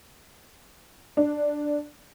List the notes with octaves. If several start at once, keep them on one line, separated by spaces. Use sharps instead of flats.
D4